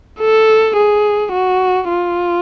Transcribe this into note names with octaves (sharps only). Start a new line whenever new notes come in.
A4
G#4
F#4
F4